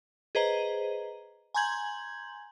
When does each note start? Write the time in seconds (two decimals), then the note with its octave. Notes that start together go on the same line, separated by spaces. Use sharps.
0.35 G#4 B4 C5 D#5 A#5
1.54 G#5 A#5 C6 G6 G#6 F#7